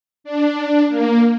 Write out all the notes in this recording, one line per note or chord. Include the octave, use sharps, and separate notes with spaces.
D4
A#3